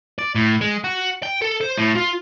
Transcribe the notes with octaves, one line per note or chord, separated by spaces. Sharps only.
D5
A2
G#3
F#4
G5
A4
C5
A2
F4